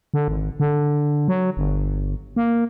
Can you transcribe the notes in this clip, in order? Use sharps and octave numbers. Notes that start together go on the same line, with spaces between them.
D3
G#1
D3
F#3
G1
A#3